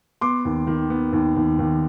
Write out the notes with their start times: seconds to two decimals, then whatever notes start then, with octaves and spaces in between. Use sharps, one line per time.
0.21 B3 C6 D6
0.45 D#2
0.67 D#3
0.90 B3
1.13 D#2
1.36 D#2
1.59 D#2